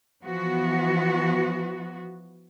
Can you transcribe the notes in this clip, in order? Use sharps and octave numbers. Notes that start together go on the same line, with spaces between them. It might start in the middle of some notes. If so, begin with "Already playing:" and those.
E3 F3 B3 F#4